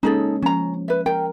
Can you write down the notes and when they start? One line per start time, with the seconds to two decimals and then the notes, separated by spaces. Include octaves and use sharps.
0.03 G#3 A#3 C#4 D#4 G#4 A4
0.43 F3 C#4 A#5
0.88 B4 E5
1.06 A#4 G5